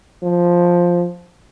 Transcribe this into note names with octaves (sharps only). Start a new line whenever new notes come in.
F3